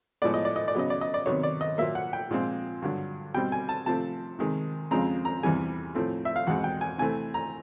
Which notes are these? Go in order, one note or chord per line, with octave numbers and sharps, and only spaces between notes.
A2 F3 G#3 B3 D5
D#5
D5
D#5
D5
C#3 F#3 B3 D#5
D5
D#5
D5
C3 D#3 F#3 B3 C#5
D5
D#5
A#2 F#3 A#3 E5
F#5
G5
A#2 F3 G#3 C4
G2 D3 F#3
B2 G3 C4 G5
G#5
A5
C3 F3 A3 C4 A5
C3 D#3 G#3
F2 C#3 F3 G#3 C4 A#5
A#5
E2 C3 E3 G3 G#5
A2 F3 A3 C4
E5
F5
E2 B2 G#3 C4 F#5
G5
G#5
C3 E3 A3 C4 G#5
A#5